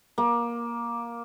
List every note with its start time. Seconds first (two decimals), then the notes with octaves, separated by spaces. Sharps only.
0.18 A#3